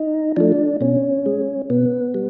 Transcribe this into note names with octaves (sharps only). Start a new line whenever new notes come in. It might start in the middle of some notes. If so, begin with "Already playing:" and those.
Already playing: D#4
F3 A3 D4
B2 C#4
G#3
B2 B3
G3